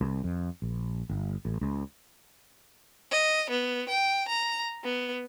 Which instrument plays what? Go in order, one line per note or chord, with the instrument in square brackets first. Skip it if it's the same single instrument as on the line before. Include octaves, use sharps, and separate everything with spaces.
[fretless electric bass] C2
F2
A#1
G1
A1
C#2
[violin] D#5
B3
G5
A#5
B3